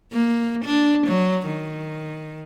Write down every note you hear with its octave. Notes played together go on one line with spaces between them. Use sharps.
A#3
D4
F#3
D#3